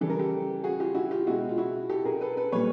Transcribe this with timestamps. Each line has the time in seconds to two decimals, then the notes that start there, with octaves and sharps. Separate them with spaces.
0.01 C#3 E3 G3 A4
0.10 A#4
0.19 G4 A4
0.64 F#4 G#4
0.79 F4 G4
0.95 E4 F#4
1.11 F4 G4
1.26 B2 G#3 E4 F#4
1.49 F4
1.58 E4 F#4
1.89 G4 A4
2.05 G#4 A#4
2.21 A4 B4
2.37 A4 B4
2.52 A#2 G3 B4 C#5